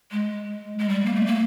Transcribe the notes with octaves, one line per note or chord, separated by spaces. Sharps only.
G#3
G#3
G3
A#3
A3
A#3